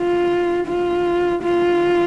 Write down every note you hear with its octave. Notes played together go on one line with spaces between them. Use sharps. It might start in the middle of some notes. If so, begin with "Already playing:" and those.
Already playing: F4
F4
F4